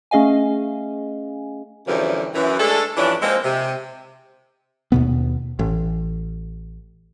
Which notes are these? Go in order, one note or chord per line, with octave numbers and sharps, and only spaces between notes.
A3 C#4 G#4 D#5 F5 G#5
F#2 B2 D3 E3 F3 G3
F#2 E3
G#3 A3 D4 A4
G2 E3 F3 C#4 D4
F3 G#3 A#3 C4
C3
D#2 B2 B3
A1